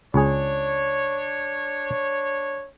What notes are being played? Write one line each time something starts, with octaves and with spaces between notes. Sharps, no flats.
C#2 D4 G#4 C#5